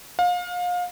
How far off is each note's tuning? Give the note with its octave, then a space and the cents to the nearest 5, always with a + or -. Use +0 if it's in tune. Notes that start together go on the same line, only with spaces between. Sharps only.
F5 +30